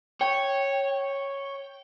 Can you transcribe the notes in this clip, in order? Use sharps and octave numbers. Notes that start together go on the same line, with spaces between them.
C#5 G5